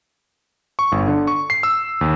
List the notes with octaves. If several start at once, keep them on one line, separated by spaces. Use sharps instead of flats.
C#6
G1
D3
C#6
C7
E6
D#2